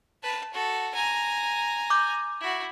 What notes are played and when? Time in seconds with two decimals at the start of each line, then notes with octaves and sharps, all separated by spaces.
0.23 B4 A5
0.53 F#4 A4
0.95 G#5 A#5
1.90 D6 G6
2.41 E4 F#4